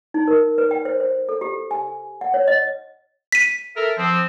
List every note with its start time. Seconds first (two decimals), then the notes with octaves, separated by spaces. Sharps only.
0.14 D#4
0.28 A#4
0.58 B4
0.71 G5
0.85 C5
1.00 C5
1.29 A4
1.41 G4
1.71 G#5
2.21 F#5
2.34 C#5
2.48 D#5
3.32 B6 D#7
3.76 A4 A#4 E5
3.97 F3 C4